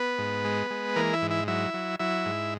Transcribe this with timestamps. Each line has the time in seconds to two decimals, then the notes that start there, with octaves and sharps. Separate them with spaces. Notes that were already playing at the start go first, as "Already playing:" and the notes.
Already playing: B3 B4
0.18 G#2
0.45 G#3
0.70 G#3
0.96 E3 A#3 A#4
1.13 E4 E5
1.22 G#2
1.31 E4 E5
1.48 F#3 E4 E5
1.74 F#3
1.99 F#3 E4 E5
2.26 G#2